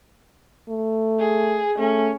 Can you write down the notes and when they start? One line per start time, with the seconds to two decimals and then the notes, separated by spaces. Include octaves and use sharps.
0.69 A3
1.19 G#4
1.79 A3 C#4